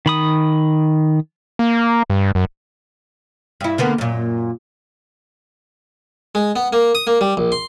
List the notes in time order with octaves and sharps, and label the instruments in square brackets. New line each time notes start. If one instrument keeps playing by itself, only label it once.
[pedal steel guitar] D#3 B5 D#6
[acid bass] A#3
G2
F#2
[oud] G2 E4
D3 A#3 B3
F#2 A#2
[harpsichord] G#3
B3
A#3
D#6
A#3
G3
A#1
C6